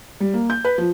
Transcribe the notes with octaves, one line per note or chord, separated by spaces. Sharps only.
G3
A#3
G6
B4
F3